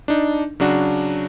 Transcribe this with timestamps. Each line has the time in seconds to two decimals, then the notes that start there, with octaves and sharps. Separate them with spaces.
0.08 D4 D#4
0.60 C#3 F#3 D4 F#4